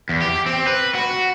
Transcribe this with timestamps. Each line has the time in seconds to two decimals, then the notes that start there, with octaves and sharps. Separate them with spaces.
0.09 E2
0.22 G4
0.46 C4
0.67 B4
0.95 F#4